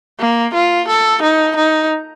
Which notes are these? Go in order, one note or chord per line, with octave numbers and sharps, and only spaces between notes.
A#3
F4
A4
D#4
D#4